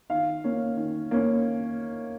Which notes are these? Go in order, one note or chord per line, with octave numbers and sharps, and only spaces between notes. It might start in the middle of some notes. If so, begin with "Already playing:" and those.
D#3 F5
A#3 C#4
D#3
A#3 C#4